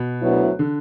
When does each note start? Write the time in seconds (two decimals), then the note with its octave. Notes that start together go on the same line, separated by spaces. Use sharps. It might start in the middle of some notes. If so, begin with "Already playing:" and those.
Already playing: B2
0.21 D2 D3 F#3 B3 E4
0.59 D3